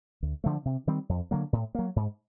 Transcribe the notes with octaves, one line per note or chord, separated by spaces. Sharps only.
D2
D3 F3 A3
C3
D#3 G3 C4
F2
D3 F#3 A#3
A2
F#3 A#3
G#2